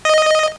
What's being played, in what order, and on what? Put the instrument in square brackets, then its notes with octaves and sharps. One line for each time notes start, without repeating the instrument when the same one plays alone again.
[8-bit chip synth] D#5